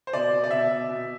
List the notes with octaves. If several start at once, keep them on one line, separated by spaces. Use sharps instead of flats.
C5
B2 D5
B2
D5
B2 E5
B2
B2